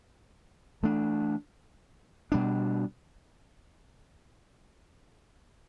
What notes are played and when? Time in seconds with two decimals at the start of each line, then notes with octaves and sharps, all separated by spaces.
0.83 E3 A3 D4
2.32 B2 G3 D4